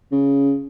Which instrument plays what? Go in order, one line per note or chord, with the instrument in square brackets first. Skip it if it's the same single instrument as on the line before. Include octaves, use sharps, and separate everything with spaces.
[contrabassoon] C#3